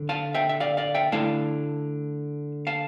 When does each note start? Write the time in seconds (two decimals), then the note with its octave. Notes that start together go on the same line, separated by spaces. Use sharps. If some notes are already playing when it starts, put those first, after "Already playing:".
Already playing: D3
0.09 F5 A5
0.35 E5 G5
0.49 E5
0.60 D5 F5
0.77 D5 F5
0.95 E5 G5
1.12 D3 A3 E4 F5 A5
2.67 F5 A5